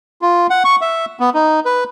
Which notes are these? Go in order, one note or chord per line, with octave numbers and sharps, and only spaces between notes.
F4
F#5
C#6
E5
B3
D#4
B4